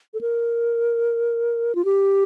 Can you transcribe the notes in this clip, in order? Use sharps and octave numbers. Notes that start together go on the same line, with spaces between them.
A4
A#4
F4
G4